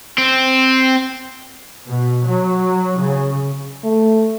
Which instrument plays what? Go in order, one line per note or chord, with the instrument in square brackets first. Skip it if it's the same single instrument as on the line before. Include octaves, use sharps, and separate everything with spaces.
[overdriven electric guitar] C4
[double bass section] B2
F#3
C#3
[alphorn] A3